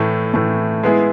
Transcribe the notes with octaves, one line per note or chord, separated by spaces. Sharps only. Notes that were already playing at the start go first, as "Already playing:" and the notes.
Already playing: A2 E3 A3
A2 E3 A3
G#3 B3 E4 G#4